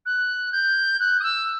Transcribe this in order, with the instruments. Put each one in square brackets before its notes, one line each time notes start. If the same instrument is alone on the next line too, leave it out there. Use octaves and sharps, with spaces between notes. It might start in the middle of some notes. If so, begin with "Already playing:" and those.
[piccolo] F#6
G6
F#6
D#6
E6